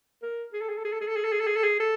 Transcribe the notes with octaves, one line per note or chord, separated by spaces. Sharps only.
A#4
G#4
A4
G#4
A4
G#4
A4
G#4
A4
G#4
A4
G#4
A4
G#4
A4
G#4
A4